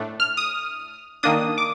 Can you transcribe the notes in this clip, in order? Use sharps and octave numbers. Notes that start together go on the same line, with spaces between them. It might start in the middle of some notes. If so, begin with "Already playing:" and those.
Already playing: A2 A3 D4
F6
D#6
D#3 A#3 D4 D#6
D6